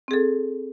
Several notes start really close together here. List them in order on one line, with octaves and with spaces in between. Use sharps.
C4 G#4 A4